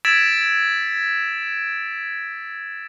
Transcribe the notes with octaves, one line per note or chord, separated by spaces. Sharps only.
E6 G#6 A6 B6 D7 E7